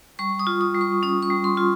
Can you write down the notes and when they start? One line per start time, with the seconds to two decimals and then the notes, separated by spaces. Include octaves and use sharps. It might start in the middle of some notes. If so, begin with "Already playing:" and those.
0.19 G3 C#6
0.39 D#6
0.47 F4
0.61 D#6
0.74 G3
0.81 C#6
1.03 C#4 D#6
1.23 C#6
1.30 G3
1.44 C6
1.57 F4